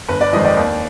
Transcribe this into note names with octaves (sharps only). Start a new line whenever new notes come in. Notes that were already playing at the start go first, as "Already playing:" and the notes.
G1 B4
D5
F2 D#3 G#3 C4 D#5
D5
D#2